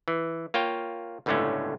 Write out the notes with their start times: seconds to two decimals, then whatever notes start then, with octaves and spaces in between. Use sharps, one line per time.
0.08 E3
0.54 A#3 F4 C#5 G5
1.26 G1 C#2 A2 D3 A3 C#4